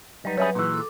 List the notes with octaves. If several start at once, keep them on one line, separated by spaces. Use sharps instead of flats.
F#3 G3 D#4 B4
G3 C#4 G#4 C#5 E5 B5
A#2 E3 D#4 F#4 G#4
A4 D6